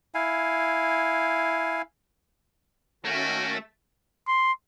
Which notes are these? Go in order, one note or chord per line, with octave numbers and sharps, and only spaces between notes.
E4 F5 G#5
D#3 A3 A#3 C#4 F#4
C6